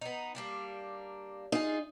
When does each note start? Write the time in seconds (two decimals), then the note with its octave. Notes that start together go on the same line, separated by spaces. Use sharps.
0.01 B3 D#4
0.35 G3 A#3 D4
1.52 D#4 F4 G#4